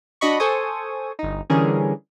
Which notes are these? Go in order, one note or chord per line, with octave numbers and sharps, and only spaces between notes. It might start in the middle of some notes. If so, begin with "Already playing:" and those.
D4 F#4 D#5 B5 C#6
A4 C5 G#5 C#6 D#6
G1 D#4
D3 E3 G3 C#4 G#4 A#4